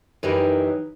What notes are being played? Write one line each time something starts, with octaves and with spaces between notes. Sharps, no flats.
F#2 D#3 E3 G4